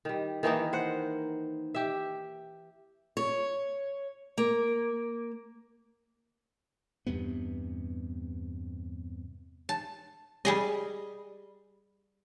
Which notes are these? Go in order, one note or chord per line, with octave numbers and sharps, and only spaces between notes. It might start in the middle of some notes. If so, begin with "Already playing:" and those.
D#3 G3
D#3 E3 A#3 D#4
C5 F#5
G4 E5
C#5
A#3
E2 G2 C3 B3
A5
G3 G#4 D#5